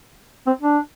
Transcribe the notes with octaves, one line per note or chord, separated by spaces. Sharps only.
C4
D4